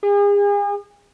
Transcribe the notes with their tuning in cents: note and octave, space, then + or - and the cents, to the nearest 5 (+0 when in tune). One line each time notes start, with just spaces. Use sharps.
G#4 -40